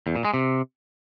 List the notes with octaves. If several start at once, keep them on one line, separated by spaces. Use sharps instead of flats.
E2
A#2
G#3
C3